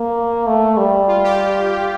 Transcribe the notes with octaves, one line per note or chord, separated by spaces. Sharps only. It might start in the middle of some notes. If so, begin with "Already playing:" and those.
Already playing: A#3
A3
G3
F4
G4